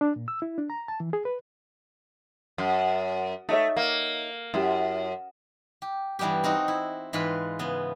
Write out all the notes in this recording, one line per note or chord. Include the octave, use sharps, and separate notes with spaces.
D4
A#2
E6
E4
D4
A#5
A5
E3
G#4
B4
F#2
A3 D#4 C#5 E5
A#3
F#2 E4 G4
G4
G2 E3 G3 B3 G4
C4 D#4 F#4
E4
G#2 E3 F4 B4 B5
C#3 B3